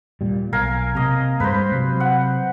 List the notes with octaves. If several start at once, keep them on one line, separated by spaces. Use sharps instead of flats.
D#1 A#2 G3
B1 A#4 F5 G#5
C3 A#3 D#5 A#5
G2 G#3 A#3 B4 C5
C3 F#3
F#5